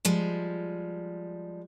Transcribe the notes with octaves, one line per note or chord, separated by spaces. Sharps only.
F3 G3 G#3